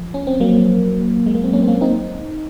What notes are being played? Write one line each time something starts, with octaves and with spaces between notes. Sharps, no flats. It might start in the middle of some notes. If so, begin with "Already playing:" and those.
Already playing: F3
C#4
C4
F#3 A#3
G#3
A#3
C4
A#3 C#4
C4
A#3 C#4
C4 D#4